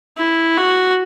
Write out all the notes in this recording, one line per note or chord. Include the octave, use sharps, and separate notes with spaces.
E4
F#4